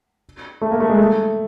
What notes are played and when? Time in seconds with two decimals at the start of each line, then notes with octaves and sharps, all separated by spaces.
0.62 A3
0.71 A#3
0.80 A3
0.90 G#3
0.98 A3